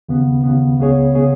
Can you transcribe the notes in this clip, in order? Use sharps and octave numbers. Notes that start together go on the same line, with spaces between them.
D#2 C#3 B3
D#2 C#3 B3
C#2 C#3 B3 G#4 C#5
C#3 B3 G#4 C#5